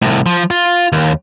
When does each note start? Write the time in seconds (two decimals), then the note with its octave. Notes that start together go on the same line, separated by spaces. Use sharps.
0.02 C2 A2
0.26 F3
0.50 F4
0.92 D#2